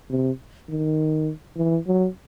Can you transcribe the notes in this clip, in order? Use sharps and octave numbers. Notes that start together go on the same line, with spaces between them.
C3
D#3
E3
F#3